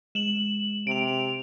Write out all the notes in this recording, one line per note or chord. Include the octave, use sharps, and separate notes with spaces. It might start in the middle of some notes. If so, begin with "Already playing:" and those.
G#3 E7 F#7
C3 D7 F7